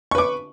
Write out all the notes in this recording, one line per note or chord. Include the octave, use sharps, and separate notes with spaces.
B4 C#6 D6